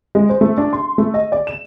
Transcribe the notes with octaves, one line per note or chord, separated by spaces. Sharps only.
G#3
C5
A3
D4
C6
A3
D#5
D5
E7